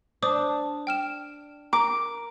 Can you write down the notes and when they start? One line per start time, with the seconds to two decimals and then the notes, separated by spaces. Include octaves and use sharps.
0.23 D4 C5 D6 D#6
0.87 G5 F6 E7
1.73 A#4 D6